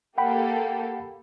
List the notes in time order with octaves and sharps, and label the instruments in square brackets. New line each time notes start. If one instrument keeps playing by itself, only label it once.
[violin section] A#3 G4 A4 [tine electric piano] F#5 G5 B5